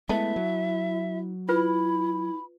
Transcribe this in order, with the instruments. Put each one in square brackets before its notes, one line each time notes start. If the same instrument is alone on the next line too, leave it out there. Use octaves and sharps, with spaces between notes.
[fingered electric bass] G#3 A3 B3 [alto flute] E4 [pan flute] E5 [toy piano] A5
[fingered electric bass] F#3
[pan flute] E4 [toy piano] F4 B4 [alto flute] B5